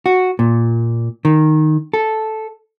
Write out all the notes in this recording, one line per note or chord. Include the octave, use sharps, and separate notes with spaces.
F#4
A#2
D#3
A4